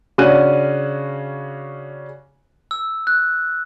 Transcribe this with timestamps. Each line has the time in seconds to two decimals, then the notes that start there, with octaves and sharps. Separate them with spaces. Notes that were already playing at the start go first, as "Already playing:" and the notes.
0.18 C#3 C#4 D4 F#4 F#6 D#7
2.71 E6
3.07 F#6